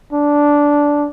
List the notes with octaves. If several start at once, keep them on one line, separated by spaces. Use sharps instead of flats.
D4